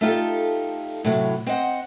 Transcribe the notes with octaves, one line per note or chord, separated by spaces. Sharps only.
A3 D#4 F4 G4 A4
A2 C3 F#3
C4 C5 D#5 F#5